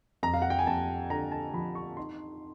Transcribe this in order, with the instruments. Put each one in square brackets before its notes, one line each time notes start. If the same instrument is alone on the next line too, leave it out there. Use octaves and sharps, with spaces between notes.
[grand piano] F2 A#5
F5
F#5
G5
G#5
F2 A5
D3 A#5
A5
F3 B5
C#6
D#4 C6